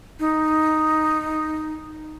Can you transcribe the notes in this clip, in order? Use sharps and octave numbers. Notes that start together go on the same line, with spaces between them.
D#4